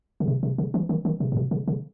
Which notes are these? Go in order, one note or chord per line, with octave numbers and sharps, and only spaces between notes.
C#3
C3
C3
C#3
E3
D#3
D#3
C3
A#2
B2
C#3
C#3